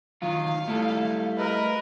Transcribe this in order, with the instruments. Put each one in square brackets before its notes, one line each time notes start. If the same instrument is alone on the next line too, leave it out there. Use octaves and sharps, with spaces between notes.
[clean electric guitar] D#3 F#3 F4 [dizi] F5
[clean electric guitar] G3 E4 A4 [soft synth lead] A3
[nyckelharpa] A#4 B4 [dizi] D#5